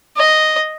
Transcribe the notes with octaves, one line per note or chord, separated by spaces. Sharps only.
D#5